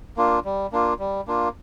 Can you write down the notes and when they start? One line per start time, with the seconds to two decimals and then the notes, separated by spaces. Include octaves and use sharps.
0.17 A#3 D4 F4
0.45 G3
0.72 A#3 D4 F4
0.99 G3
1.27 A#3 D4 F4